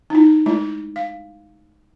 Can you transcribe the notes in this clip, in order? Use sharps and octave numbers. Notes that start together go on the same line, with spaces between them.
D#4 E4
G#3 A3 E4
F5